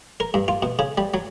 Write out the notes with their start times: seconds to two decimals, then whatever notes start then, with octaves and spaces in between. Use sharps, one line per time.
0.20 A#4
0.34 G2
0.48 F4
0.62 B2
0.79 C#3
0.98 G3
1.14 F#3